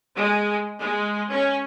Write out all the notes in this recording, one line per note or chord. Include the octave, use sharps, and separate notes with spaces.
G#3
G#3
C#4